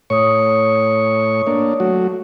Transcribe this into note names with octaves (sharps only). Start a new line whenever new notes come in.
A2 C#5 C#6 D#6
A#3 D4
F#3 A3 F#4